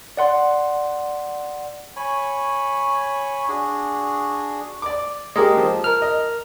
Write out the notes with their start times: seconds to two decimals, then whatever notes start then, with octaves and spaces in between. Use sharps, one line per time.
0.17 D5 F#5 C6
1.96 C#5 G#5 B5
3.48 D4 F#4 G#4
4.82 D5 D6
5.36 G#3 G4 A#4 D#5
5.57 F3
5.84 A#4 F6
6.02 D#5